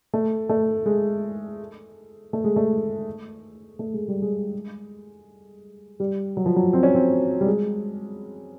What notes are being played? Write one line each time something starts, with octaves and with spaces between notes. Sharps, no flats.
A3
A3
G#3
A3
G#3
A3
A3
G#3
G3
G#3
G3
F#3
F3
F#3
C4
C#4
C4
G3
G#3